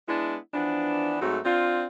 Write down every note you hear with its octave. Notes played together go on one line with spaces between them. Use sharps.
G#3 B3 D4 E4
E3 F3 B3 D4
G#2 F#3 A3 C4 F#4
C4 D4 F4